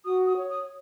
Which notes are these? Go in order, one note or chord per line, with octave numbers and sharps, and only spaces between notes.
F#4 D#6
D#6
C#5
D#6